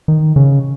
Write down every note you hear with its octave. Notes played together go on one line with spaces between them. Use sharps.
D#3
C#3